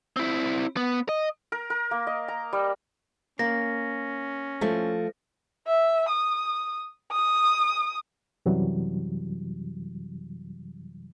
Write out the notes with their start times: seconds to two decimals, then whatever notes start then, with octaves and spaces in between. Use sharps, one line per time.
0.17 C4 E4
0.77 B3
1.09 D#5
1.52 A#4
1.70 A#4
1.91 A#3
2.07 D#5
2.28 A#5
2.53 G3
3.39 A#3 C#4 A#6
4.61 F3 A3
5.67 E5
6.09 D#6
7.12 D#6
8.46 F#2 C3 E3 F#3 G3